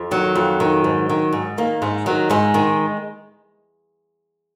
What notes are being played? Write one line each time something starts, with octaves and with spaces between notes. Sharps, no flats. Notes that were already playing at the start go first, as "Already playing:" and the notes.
Already playing: F2
D#3 F#3
F2
D#3
G#2
D#3
G#2
D#3 A#3
G#2 G#3
D#3 F#3
G#2 G#3
D#3